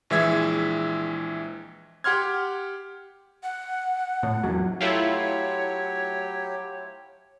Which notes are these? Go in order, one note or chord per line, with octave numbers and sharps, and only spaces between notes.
A#1 E3 G#3 E5 G#6
G4 F#5 C6 F6 G#6
F#5
A2
E2 F#3
F#3 A3 E4 F4 G4 C#5